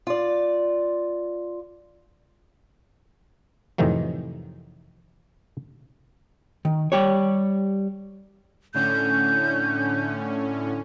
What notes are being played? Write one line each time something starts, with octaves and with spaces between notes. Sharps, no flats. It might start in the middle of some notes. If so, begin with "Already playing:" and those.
F4 D5
F2 A2 C3 D#3 E3 F#3
D#3
G3 G4 C#5
A2 D3 C#4 G6